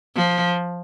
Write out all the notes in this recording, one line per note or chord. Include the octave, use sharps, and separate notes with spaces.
F3